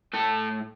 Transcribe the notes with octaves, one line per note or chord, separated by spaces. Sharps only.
A2 A3 A4